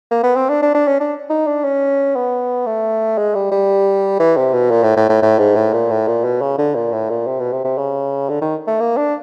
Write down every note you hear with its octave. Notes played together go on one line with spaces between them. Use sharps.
A#3
B3
C4
D4
D4
D4
C#4
D4
D#4
D4
C#4
B3
A3
G#3
G3
G3
E3
C3
B2
A#2
A2
A2
A2
A2
G#2
A2
A#2
A2
A#2
B2
C#3
D3
A#2
A2
A#2
C3
B2
C3
C3
C#3
D3
D#3
A3
A#3
D4